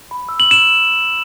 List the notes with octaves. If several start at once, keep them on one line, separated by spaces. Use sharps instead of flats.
B5
E6
F#7
E6
E7